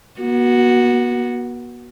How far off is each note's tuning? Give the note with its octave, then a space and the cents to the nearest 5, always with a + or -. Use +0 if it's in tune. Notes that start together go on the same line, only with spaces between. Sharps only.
B3 -40 F#4 +0